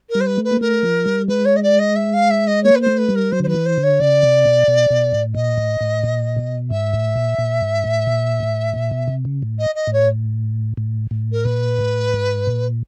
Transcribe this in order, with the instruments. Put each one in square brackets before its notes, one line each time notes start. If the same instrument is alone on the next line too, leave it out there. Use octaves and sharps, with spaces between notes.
[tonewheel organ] G3 [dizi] A#4
[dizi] C5
B4
[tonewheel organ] A3
[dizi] B4
[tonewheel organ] A#3
[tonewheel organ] A3 [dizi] A#4
[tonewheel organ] F3
G3
[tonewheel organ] G#3 [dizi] B4
[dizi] C#5
D#5
D5
D#5
E5
F5
E5
D#5
[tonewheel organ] A#3 [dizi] C#5
[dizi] B4
C5
[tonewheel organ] A3
[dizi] B4
[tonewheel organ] G3
[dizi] A#4
[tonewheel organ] F#3 [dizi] C5
[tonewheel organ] D3
[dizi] C5
[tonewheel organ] D#3 [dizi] B4
[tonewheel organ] E3
[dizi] C5
[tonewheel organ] D3
[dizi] C#5
[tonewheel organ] C#3 [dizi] D5
[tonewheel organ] C3
B2
B2
B2
A2
[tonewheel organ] A#2 [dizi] D#5
[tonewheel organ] A2
A2
A#2
B2
[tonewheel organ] G#2 [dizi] E5
[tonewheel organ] A2
A#2
A#2
G#2
A2
A#2
A2
A#2
B2
C3
C#3
A2
[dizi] D#5
D#5
[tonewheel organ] A2
[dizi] C#5
[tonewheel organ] A2
A2
[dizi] A#4
[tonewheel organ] A#2 [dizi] B4
[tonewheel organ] A2
G#2
A#2